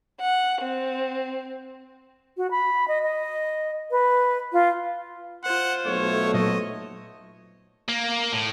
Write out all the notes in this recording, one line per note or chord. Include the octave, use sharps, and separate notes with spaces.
F#5
C4
F#4
B5
D#5
D#5
B4
F4
F4 C5 F#5
B1 A3 C#5
A#2 F#3 D#5 C#6
A#3
A2